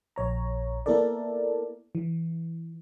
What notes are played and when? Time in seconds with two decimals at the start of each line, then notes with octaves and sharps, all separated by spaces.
0.16 A#1 C#5 A#5
0.86 A#3 B3 E4 A4 A#4 D5
1.95 E3